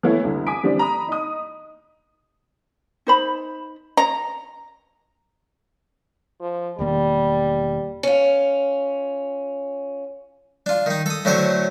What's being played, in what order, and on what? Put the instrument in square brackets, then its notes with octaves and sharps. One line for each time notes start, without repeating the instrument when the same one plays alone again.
[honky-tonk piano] E3 A3 B3 E4 A4 C#5
C2 D3
G#5 D6 D#6 B6 D7
D3 E3 G3 C4 D4
A#5 B5 D#6
D#4 D#6
[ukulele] D#4 C5 B5
[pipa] A#5
[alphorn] F3
[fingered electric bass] E1 D#3 A#3 [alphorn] G3
[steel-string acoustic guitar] C#4 F4
[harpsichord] D4 F4
D#3 D#4
A4 D#6
A2 D3 F#3 A3 C5 C#5